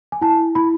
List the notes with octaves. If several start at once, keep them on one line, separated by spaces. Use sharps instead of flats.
G#5
E4 A5
E4 B5